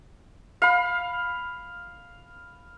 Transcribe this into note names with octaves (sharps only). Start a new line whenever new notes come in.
F5 B5